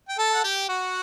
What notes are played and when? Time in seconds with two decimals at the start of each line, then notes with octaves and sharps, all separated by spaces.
0.09 G5
0.18 A4 A5
0.34 F#5
0.44 G4 G5
0.69 F#4 F#5